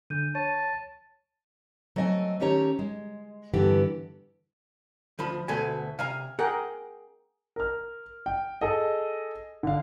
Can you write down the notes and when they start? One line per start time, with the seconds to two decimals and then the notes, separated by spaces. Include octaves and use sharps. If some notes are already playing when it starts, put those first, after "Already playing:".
0.10 D3 D4 G6 D#7
0.35 C#5 A5 D#7
1.96 F#3 A3 C4 D#5 G5 G#5
2.40 D#3 A3 C#4 G4 C#5 A#5
2.79 G#3
3.54 G2 D3 E3 B3 G4
5.19 D2 F3 B5
5.48 D2 B2 A3 G#5
5.99 C3 F5 G#5 A#5
6.39 G#4 A#4 F#5 G5
7.56 A#4 F6
8.26 G5
8.61 G#4 A4 D#5
9.63 D3 F5